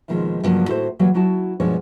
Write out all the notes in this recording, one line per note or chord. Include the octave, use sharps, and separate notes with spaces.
D#2 B2 D#3 F3 G#3
G2 C#3 F3 F#3 A#3 D4
A2 E4 F#4 A4 A#4 C5
E3 F#3 G3 A#3 F#4
F#3 E4 F#4 A5
G2 B2 F3 G#3 D4 C#5